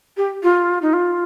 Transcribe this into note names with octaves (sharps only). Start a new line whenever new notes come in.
G4
F4
D#4
F4